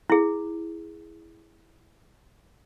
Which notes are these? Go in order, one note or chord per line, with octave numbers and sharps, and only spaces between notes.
E4 G#4